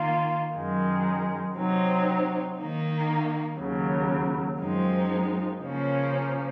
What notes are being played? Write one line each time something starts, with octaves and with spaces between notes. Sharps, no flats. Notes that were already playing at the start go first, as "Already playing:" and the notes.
Already playing: D#3 A#3 F4
F#2 D#3 G#3
C3 F#3 C4 D#4
D#3 A#3 D#4
D#2 C#3 F#3
F#2 F3 G#3 C4 D#4
C#3 F3 A#3 C#4